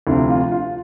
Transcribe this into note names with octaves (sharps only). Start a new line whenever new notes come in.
D2 C3 F3 E4
F4
F4